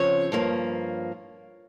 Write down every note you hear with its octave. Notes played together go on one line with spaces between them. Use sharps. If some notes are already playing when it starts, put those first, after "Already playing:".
Already playing: C#3 F3 C4 C#5
G2 F3 A#3